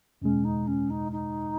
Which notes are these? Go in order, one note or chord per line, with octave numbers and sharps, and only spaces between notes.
E2 B2 G#3 C#4
D#4
C#4
D#4
D#4